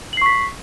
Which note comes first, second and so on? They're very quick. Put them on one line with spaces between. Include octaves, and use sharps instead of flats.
F#7 C7 C#6 B6